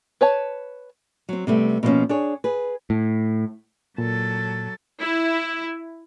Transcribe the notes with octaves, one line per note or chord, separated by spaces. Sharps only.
B4 C#5 A5
F#3 C4
C3 G3 A3 B3
B2 D3 F3 G3 A#3 C#4
D4 G#4 C#5
G#4 B4
A2
A#2 F#3 A4
E4